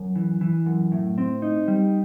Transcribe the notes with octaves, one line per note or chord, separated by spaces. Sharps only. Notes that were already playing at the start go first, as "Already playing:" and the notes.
Already playing: F#2
E3
E3
F#2
A2
C4
D#4
G3